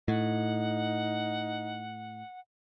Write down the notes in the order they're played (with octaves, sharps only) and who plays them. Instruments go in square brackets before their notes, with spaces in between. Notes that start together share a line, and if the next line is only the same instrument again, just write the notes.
[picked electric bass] A2 [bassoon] D#4 [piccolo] F#5